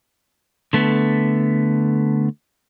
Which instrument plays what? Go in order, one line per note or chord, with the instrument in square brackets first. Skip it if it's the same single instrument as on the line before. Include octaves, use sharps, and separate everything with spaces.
[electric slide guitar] D3 A3 B3